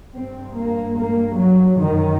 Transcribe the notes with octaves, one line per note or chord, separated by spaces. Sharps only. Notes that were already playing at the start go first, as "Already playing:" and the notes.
G2 C4
A#3
A#3
F#3
F#2 D#3